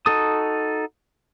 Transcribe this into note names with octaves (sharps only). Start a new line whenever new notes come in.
D#4 F#4 A4 D#6